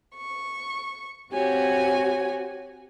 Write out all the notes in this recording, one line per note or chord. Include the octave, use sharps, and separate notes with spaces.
C#6
C4 F#4 G4 C#5 G#5